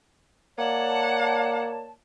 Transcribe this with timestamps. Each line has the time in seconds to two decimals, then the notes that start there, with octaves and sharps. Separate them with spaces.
0.58 A#3 C#5 D5 F#5 A5